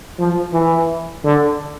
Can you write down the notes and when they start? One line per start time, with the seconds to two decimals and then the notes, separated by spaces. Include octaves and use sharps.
0.19 F3
0.54 E3
1.24 D3